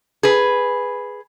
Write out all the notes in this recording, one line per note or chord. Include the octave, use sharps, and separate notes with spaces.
G#4 B4